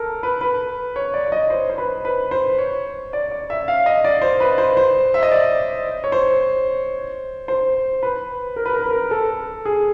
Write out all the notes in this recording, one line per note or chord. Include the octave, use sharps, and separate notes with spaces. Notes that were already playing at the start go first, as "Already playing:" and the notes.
Already playing: A4 A#4
B4
B4
C#5
D5
D5
D#5
C5
C5
B4
B4
C5
C#5
D5
D5
E5
F5
D#5
D5
C5
B4
C5
C5
E5
D#5
D5
C#5
C5
C5
B4
A#4
B4
A#4
B4
A#4
A4
G#4